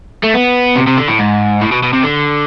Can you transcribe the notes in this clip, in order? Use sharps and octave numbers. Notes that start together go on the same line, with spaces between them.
A3
B3
C3
C3
D3
A2
G#2
A2
B2
B2
C3
D3